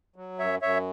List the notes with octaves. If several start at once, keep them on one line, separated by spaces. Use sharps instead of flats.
F#3
F#2 C#5 E5
F#2 C#5 E5